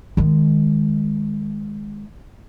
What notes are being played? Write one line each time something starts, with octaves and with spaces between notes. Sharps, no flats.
D#3 G#3